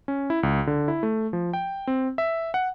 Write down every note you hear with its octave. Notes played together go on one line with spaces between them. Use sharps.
C#4
E4
C#2
D3
E4
A3
F3
G5
C4
E5
F#5